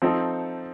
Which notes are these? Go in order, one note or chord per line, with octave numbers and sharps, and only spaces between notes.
F3 C4 D#4 A4